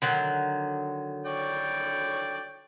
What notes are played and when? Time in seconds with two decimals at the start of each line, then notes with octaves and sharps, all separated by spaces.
0.02 D3 D#3 F#3
1.26 C#5 D5 G5